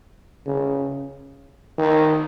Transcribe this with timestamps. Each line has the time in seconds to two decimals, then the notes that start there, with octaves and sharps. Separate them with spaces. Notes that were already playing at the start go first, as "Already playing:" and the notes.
0.46 C#3
1.78 D#3